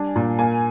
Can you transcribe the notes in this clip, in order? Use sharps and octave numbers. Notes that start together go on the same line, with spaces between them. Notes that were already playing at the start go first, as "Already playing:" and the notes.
Already playing: G3 D4 G#5
A#2
A#3 G#5